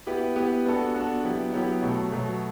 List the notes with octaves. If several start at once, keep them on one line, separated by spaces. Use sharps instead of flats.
B3 E4 G4 B4
B3 E4 G4 B4
B3 D4 F#4 A4
B3 D4 F#4 A4
F#3 B3 E4 G4
F#3 B3 E4 G4
B2 F#3 A3
B2 F#3 A3